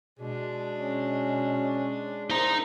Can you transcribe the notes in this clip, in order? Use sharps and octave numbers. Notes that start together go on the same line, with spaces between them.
B2 G#3 D4
C#4
D#4 E4 A#4 C5 A#5